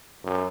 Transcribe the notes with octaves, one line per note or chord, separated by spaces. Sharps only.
F#2